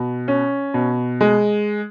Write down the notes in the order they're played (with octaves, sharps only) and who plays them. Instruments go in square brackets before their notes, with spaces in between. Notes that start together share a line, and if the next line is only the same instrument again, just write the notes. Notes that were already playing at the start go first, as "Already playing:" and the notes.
Already playing: [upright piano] B2
C#4
B2
G#3